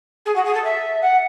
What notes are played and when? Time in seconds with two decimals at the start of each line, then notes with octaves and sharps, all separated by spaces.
0.25 G#4
0.35 F#4
0.44 G#4
0.54 A4
0.64 E5
1.01 F#5